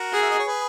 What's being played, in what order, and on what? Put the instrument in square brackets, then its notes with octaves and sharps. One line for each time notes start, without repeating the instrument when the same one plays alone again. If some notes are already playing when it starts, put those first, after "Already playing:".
Already playing: [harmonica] F#4 A#4
[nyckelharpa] G#4 [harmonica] F#5
[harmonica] E5
D#5
C#5
G#4 B4